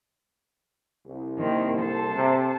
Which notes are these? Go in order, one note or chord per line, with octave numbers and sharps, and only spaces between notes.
C2
D#3 A#3 C4
A4 C5 A5
C3